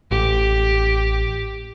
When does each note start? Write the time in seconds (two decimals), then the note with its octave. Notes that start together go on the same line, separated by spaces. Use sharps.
0.11 A1 G4